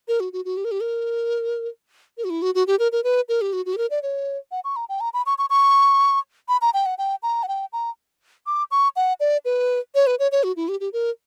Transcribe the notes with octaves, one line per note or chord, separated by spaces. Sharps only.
A#4
F#4
F#4
F#4
G4
A#4
G4
A#4
A#4
F#4
E4
F#4
F#4
G4
A#4
A#4
B4
A#4
G4
F#4
F#4
G4
A#4
D5
C#5
F#5
C#6
A#5
G5
A#5
B5
C#6
C#6
C#6
B5
A#5
G5
F#5
G5
A#5
F#5
G5
A#5
D6
C#6
F#5
D5
B4
C#5
B4
C#5
C#5
F#4
E4
G4
G4
A#4